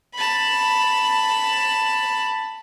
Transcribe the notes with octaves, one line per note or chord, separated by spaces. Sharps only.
A5 B5